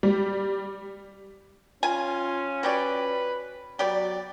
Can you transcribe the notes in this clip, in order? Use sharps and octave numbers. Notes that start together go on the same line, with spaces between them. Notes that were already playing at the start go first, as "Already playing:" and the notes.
G3
C#4 F4 G#5
F#4 G4 B4 D5
F#3 B3 G4 D5